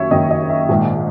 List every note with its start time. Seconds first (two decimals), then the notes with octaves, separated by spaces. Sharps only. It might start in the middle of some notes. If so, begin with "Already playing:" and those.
Already playing: F#1 F#2 D#3 C#5 E5
0.11 F#1 F#2 D#3 D#5
0.31 D#5
0.49 E5
0.69 A#1 G#2 D#3